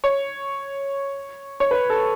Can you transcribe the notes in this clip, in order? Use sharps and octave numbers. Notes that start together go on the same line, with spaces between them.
C#5
C#5
B4
A4